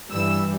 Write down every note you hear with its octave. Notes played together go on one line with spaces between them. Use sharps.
G2 E3 G3 E6